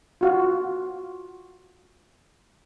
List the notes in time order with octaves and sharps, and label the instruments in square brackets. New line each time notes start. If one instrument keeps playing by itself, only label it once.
[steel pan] F4 F#4 F5